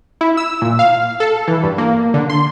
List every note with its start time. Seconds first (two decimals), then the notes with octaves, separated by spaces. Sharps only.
0.21 E4
0.37 E6
0.62 A#2
0.79 F5
1.20 A4
1.48 E3
1.63 G2
1.78 A#3
2.14 D3
2.30 C6